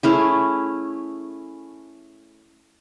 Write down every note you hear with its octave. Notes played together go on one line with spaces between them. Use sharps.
A3 C#4 E4 G#4